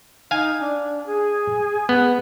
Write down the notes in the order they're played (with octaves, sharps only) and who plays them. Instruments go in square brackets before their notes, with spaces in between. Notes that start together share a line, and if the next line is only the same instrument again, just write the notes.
[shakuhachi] D#4 [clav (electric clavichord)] F5 G#5
[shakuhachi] D4
G#4
[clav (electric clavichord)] B3